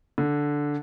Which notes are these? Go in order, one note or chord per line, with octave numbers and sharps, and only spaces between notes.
D3